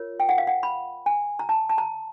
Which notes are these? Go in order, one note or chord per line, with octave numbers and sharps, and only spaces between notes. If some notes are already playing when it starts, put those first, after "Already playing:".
Already playing: F4 A#4 C#5
G5
F#5
F5
F#5
B5
G#5
A#5
A5
A5
A#5